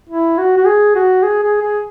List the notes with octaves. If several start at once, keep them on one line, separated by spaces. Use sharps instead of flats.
E4
F#4
F#4
G#4
F#4
G#4
G#4
G#4